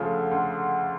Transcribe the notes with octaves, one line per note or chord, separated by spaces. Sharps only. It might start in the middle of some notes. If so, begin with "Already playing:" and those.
Already playing: D2 C#3 F3 A3
D2